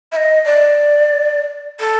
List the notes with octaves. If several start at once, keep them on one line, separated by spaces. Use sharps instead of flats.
E5
D#5
D5
A4